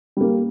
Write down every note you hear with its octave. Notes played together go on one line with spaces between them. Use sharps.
G3 A#3